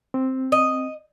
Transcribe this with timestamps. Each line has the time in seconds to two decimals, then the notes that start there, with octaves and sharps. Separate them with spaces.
0.14 C4
0.52 D#5